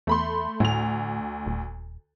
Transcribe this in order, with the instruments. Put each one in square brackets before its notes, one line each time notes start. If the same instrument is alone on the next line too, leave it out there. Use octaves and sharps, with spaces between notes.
[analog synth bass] E2 [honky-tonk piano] A3 B5 C6
[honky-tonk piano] D2 F7 [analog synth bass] A2
[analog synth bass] D#1